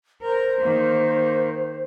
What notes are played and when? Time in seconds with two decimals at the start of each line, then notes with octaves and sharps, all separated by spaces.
0.22 A#4 C5
0.61 D#3 A#3